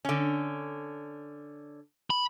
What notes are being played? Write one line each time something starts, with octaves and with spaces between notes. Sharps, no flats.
D3 C#4
B5